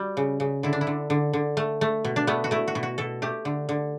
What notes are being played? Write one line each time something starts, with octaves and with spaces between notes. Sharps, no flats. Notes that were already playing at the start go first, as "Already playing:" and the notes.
Already playing: G3 F#4
C#3
C#3
D3 E4
D4
E4
D3
D3
D3
A3
A3
B2
D4
A3 B3
F#4
A3 E4
F#4
B2
F#4
B2 A4
A3 G4
D3
D3